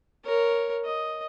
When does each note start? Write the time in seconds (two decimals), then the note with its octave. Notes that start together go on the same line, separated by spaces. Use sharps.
0.24 A#4 C#5
0.84 D#5